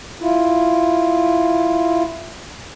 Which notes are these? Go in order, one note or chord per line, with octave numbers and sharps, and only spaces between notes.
E4 F4